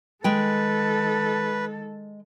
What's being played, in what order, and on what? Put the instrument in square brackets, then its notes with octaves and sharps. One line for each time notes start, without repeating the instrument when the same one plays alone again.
[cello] D#3 A4 [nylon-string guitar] G#3 G5 [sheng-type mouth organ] B4